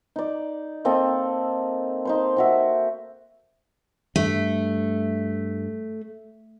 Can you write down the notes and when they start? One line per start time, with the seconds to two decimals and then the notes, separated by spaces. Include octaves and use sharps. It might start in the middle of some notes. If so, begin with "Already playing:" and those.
0.16 D#4 D5
0.85 A#3 C4 A4 D#5
2.05 D#4 C5 C6
2.36 C4 F#4 E5
4.16 G2 A3